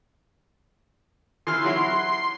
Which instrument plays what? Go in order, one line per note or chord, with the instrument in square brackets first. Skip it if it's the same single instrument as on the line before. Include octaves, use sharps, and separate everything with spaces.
[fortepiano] E3 F6 [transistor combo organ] C6
[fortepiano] F#3 E4 F#4